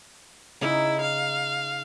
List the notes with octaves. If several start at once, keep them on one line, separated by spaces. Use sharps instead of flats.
C#3 D#4 E4
F5